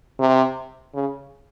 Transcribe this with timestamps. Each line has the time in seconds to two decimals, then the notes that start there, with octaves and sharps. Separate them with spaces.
0.20 C3
0.94 C#3